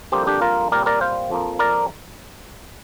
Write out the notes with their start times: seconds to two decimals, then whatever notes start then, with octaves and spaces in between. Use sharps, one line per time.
0.12 F2 D3 G3 A#3 G4 C5
0.27 D4 G4
0.41 F4 A#4
0.72 A#2 G3 C4 A#4 D5
0.86 A#4 D5
1.01 C5 F5
1.30 F2 F3 A#3
1.59 A#4 D5